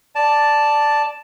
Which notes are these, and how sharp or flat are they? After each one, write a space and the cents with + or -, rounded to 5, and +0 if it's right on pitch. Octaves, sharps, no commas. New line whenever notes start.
D5 +0 A5 +0